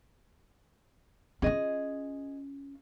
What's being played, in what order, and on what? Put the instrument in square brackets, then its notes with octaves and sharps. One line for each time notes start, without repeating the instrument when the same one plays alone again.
[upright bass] C#4 F4 [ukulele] G#4 D#5